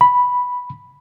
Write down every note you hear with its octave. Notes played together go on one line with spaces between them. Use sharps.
B5